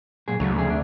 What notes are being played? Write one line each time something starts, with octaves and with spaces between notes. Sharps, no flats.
F#2 A#2 G#4
D2 C#3 F#3 A3
F2 C3 G#4
D4